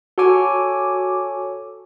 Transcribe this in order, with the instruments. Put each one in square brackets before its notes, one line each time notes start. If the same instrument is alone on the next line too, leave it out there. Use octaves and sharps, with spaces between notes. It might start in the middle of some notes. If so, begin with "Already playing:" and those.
[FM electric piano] F#4 D6 [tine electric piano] A4 C#5 G#5